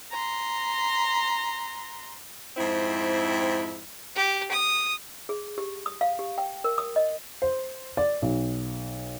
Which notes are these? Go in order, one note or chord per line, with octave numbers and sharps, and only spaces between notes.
A#5 C6
F2 G#2 C4 E4
G4
D#6
G#4
G4
D#6
F5
G4
G5
A#4
D#6
D#5
C5
D5
B1